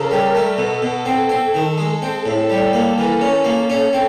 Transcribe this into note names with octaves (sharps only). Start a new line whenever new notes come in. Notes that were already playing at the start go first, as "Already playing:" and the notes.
Already playing: C#3 A4 A#4
G3
A3 A4
B2
A4
B2
C4 A4
C4
D#3
G#3
C4
A2
G3 A4
A#3
A#4
E3
C#4 A4
A#3
C#4
C4